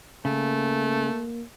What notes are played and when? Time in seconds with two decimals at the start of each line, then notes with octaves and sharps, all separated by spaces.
0.25 C#3 A3 A#3